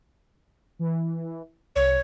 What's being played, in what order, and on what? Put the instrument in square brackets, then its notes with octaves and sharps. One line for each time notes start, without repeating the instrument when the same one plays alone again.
[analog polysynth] E3
[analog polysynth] C2 [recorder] C#5